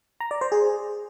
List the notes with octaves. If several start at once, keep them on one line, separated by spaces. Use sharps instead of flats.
A#5
D5
C5
G#4